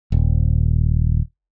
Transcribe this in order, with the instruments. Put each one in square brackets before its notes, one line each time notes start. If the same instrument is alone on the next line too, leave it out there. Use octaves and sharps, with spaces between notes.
[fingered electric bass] D#1